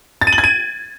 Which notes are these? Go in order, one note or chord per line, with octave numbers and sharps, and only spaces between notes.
A6
D#7
F#7
G#6
D#7